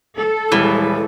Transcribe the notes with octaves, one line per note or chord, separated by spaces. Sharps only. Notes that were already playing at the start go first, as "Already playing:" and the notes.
A4
D#1 E3 G3 G#3 E4